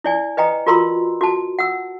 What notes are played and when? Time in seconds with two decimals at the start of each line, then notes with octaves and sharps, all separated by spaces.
0.04 E4 D5 G#5
0.37 B4 D#5 G5 A#5
0.66 F4 F#4 A#4 A#5 C6 E6
1.21 F#4 A5
1.59 F#5 E6